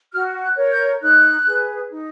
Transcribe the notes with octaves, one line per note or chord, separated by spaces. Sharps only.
F#4 F6
F#6
A#4 C#5
G6
D#4 F#6
G#4
B4
D#4